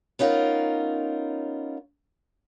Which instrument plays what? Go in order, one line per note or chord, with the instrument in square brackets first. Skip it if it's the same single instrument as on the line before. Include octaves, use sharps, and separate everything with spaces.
[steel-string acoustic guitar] B3 C#4 D#4 F4 A#4